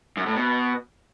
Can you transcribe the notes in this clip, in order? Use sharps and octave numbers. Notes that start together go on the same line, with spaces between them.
F#2
A2
B2